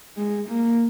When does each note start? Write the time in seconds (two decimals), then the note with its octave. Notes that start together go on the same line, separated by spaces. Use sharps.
0.17 G#3
0.48 A#3